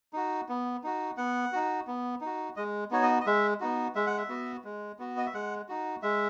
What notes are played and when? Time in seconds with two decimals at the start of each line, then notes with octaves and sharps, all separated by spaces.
0.13 D#4 F#4
0.49 B3
0.84 D#4 F#4
1.17 B3 F#5
1.53 D#4 F#4
1.87 B3
2.21 D#4 F#4
2.56 G#3 D#5
2.91 B3 D#4 F#4 C#5
3.03 D#5
3.21 D#5
3.26 G#3 E5
3.60 B3 D#4 F#4
3.95 G#3 E5
4.07 F#5
4.17 E5
4.29 B3 F#4
4.64 G#3
4.99 B3 F#4
5.17 D#5
5.26 E5
5.34 G#3 F#5
5.69 D#4 F#4
6.02 G#3 E5